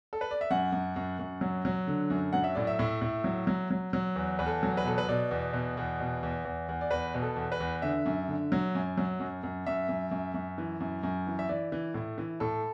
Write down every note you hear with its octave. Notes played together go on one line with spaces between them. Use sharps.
A4
B4
D5
E5
F#2 F#5
F#2
F#2
F#2
F#3
F#3
D3
F#2
F#3 F#5
E5
A2 D5
E5
A2
A2
F#3
F#3
F#3
F#3
E2
E2 B4
A4
F#3
B4
B2 A4
B4
B2 D5
E2
B2
E2
B2
E2
E2
E2
D5
E2 B4
B2
A4
E2
B4
E2
D3 E5
F#2
D3
F#3
F#2
F#3
F#2
F#2
F#2 E5
F#2
F#2
F#2
E3
F#2
F#2
E3
E5
E3 D5
E3
A2
E3
A2 A4